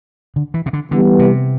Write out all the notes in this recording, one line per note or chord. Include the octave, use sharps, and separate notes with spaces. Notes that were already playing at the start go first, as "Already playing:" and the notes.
D3
E3
C3
D3
D3 E3 G3 B3
C3